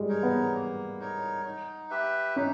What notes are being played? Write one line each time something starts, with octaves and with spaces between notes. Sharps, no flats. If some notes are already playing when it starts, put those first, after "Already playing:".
Already playing: G3 G#3
D#4 A#4 C#5
B3
A#3
D#4 A#4 C#5
D#4
G4 B4 E5
C#4 D#4